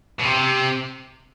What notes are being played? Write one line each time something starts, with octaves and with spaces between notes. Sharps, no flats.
B2
C3